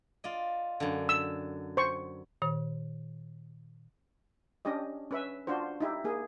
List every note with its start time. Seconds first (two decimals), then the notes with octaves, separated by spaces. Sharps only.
0.24 F4 D5 D#5
0.80 F#2 D3
1.09 E6
1.77 C5 C#6
2.42 A#2 D#3 C5
4.65 C#4 D4 G4 D#5
5.11 C#4 B4 E5
5.47 D4 F4 F#4 C5
5.81 D#4 E4 G4
6.04 A#3 G#4